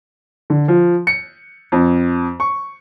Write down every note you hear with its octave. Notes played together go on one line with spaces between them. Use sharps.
D3
F3
C#7
F2
C#6